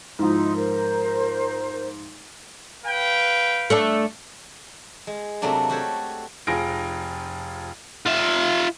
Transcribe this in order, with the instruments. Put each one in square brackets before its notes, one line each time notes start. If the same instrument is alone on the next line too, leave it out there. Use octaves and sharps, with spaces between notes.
[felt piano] G#2 F3 [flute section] D#4 E4 C6
[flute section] A#4 C5
[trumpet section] B4 F5 G5
[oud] A3 D4 A4
[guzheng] G#3
C3 F#3 A3 A#3 D4
F#4 G4 A4 C5 C#5
[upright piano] F1 F3 F4 G#4 A#6 D7
[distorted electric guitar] F4 E5